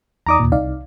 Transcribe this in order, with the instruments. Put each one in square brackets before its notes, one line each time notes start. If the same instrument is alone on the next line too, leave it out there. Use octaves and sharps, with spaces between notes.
[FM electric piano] E2 D#4 D5 [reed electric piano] A#5 D6 D#6
[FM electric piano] D#2 A#2
[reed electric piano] C2 [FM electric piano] D#4 D5 F5